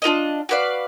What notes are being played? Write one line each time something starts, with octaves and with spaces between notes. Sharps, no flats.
D4 F4 A#4 D#5
F#4 B4 D5 F5